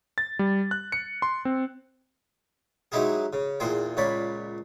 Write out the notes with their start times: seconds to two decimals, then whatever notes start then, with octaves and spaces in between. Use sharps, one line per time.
0.18 A6
0.39 G3
0.71 F#6
0.92 C#7
1.22 C6
1.45 C4
2.92 F#3 G#3 D#4 E4 G4 G#4
3.33 C#3
3.60 E2 A#2 G#4 C5 G5
3.97 C#2 A#2 C#5 D5 B5